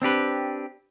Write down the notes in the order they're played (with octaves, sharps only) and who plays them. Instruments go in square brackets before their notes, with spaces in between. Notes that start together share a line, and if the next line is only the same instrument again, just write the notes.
[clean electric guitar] C4 D4 G4 B4